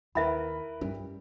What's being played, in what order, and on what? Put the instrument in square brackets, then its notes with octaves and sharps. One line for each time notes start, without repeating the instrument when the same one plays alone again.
[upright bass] D#2 [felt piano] E4 A#4 B4 [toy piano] E5 B5
[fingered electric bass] G2 C#4 [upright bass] G3